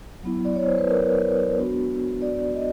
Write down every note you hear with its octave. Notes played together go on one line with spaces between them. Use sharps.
F#3 B3 E4
D5
C#5
C5
B4
A#4
G#3 B3 D4 F#4
D5
D#5